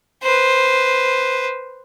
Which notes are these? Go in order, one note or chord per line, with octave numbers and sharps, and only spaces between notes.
B4 C5